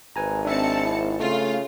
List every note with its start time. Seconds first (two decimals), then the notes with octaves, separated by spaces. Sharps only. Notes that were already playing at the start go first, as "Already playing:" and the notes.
0.16 G#1 B4 G#5 A#5
0.45 C4 D4 E5 A5 C#7
0.85 E4
1.20 C#3 A3 F4 F5